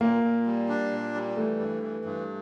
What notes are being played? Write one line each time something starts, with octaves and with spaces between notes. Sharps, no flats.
A#2 A#3
A#2
G3
D4
A#2
G3
E3 A3
G2
E3
G2